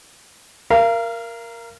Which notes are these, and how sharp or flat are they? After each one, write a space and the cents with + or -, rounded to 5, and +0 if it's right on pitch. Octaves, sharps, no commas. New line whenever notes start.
A#4 +0 F5 -35